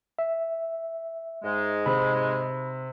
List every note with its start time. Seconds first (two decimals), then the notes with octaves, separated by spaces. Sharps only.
0.19 E5
1.44 G#2 G#3
1.86 C3 B5